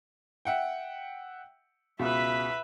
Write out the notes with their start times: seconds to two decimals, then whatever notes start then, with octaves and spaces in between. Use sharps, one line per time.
0.45 E5 F#5 G5
1.99 C#2 B2 B4 E5